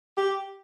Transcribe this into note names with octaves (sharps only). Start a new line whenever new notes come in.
G4